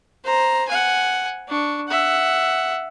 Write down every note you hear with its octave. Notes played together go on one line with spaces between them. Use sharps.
C5 A#5
F#5 G#5
D4 C#6
E5 F#5